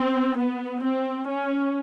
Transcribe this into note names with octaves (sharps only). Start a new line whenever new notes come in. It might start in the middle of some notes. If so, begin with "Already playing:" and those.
Already playing: C4
B3
C4
C#4